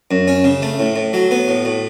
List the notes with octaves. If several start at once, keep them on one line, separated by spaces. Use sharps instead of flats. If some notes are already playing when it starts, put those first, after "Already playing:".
F#2
C#4
C#3
A3
A2
A2
F#3
B3
A2
A2